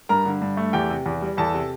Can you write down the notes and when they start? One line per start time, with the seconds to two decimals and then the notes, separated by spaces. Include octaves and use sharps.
0.09 G2 A#4 A#5
0.25 D3
0.42 G2
0.57 A3
0.73 E2 G4 G5
0.90 C3
1.06 E2
1.22 G3
1.37 E2 A4 A5
1.53 C3